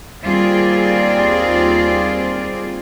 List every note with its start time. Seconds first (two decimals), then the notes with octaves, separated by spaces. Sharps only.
0.23 D#2 G3 C4 F4 G#4 D5